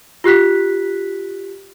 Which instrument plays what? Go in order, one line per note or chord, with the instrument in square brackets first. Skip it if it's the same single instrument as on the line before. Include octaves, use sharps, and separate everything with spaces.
[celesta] F4 G4 F#6 B6